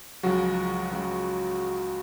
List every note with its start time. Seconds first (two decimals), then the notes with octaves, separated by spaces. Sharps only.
0.23 C#2 C#3 F3 F#3 F#4
0.90 C#2 C#3 F#3